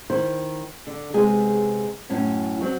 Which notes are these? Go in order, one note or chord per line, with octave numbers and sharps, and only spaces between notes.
D#3 E4 C5
D3
C3 G#3 B3 G#4
F#2 A2 C#4
F#3 C4 F#4